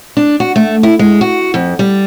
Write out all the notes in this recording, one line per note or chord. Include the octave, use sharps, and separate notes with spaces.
D4
F#4
A3
E4
G#3
F#4
F2
G3